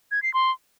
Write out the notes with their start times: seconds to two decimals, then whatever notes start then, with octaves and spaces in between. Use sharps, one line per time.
0.11 G#6
0.23 C7
0.34 C6